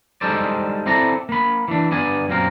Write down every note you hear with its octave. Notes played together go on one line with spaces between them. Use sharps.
G3 G#3 D#4 A4 C5 D5
C4 E4 A4 D5 A#5
A#3 B5
E3 D4
G2 B3 D5 G#5
F#2 A#2 A#3 C4 A#4